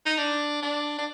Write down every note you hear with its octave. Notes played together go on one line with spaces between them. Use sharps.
D#4
D4
D4
D4